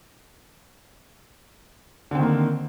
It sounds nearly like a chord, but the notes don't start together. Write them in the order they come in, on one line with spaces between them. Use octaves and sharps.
D3 C4 D#3 A#3